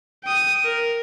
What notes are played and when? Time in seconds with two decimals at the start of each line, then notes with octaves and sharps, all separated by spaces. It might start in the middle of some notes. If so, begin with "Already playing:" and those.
0.24 G5 D#6
0.65 A#4